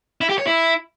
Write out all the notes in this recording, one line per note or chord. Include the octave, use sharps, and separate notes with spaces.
E4
G4
C#5
E4